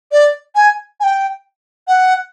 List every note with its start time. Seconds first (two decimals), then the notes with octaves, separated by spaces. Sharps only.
0.12 D5
0.55 G#5
1.00 G#5
1.04 G5
1.88 F#5